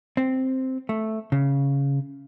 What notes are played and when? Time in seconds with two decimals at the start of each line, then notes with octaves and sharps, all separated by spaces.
0.17 C4
0.89 A3
1.32 C#3